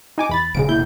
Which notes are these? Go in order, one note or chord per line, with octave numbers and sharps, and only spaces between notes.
D#4 G#5 D6
E2 B5 A6
D#1 C#3 G#3 D7
E1 A#3 E4 G6